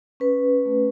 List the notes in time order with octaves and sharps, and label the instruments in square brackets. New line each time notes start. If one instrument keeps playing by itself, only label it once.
[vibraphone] C#4 B4
A3